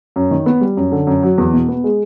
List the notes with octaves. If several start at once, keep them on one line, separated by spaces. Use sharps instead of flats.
F#2
D#3
B3
G3
F#2
D3
F#2
F#3
E2
B2
B3
G#3